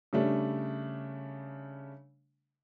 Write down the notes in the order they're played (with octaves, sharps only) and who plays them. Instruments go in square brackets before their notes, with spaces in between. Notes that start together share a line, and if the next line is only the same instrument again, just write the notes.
[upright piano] C#3 G3 A3 D4